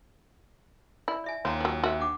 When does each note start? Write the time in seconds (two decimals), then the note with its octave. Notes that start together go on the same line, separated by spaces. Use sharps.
1.08 E4 D5
1.24 D5 E5 G#5
1.45 D#2 F4 C#5 F#5 A#5
1.60 F3 F#3
1.84 F#4 E5
2.00 D4 F#5 D6